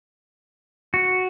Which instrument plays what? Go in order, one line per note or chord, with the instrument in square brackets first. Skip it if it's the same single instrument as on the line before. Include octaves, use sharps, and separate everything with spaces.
[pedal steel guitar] F#4